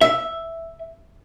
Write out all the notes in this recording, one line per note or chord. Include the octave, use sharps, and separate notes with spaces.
E5